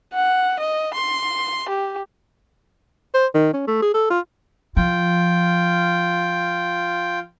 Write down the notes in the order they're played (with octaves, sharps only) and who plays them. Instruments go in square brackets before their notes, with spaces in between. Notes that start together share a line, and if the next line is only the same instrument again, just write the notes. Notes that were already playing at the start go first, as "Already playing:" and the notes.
[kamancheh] F#5
D#5
C6
G4
[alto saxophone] C5
D#3
C#4
A3
G#4
A4
F4
[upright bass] F3 [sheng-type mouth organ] F4 G5